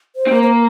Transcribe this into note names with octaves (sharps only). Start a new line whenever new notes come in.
C5
C4
A#3
C5
A#4